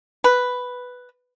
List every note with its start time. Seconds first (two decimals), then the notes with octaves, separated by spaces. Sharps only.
0.24 B4